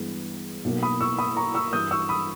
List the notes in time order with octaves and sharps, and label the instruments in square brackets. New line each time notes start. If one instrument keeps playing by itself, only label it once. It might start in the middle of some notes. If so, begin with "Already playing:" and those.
Already playing: [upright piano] G2 E3 G#3 B3
B1 B2 A#3
B5 D#6
C#6 E6
B5 D#6
A#5 C#6
C#6 E6
G2 E3 G3 D#6 G6
C#6 E6
B5 D#6